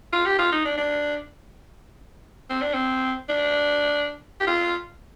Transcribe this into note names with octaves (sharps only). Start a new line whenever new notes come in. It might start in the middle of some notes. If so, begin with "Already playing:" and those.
F4
G4
F4
D#4
D4
D4
C4
D4
C4
D4
G4
F4